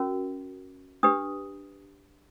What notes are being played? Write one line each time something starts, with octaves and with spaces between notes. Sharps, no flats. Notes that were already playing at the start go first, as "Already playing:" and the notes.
Already playing: C#4 F#4 A#4
D4 G4 B4 D#6